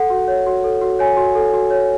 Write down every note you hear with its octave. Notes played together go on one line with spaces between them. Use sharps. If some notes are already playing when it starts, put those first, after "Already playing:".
Already playing: A4 F#5
F#4
C#5
F#4
A4
F#4
C#5 G#5
F#4
A4
F#4
C#5